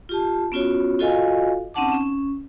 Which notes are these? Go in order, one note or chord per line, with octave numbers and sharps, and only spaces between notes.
F4 G4 A5
B3 C#4 F4 F#4 C#5
F4 F#4 A4 D#5 F5 G#5
C4 C#4 D#4 F#5 A5 D6
C#4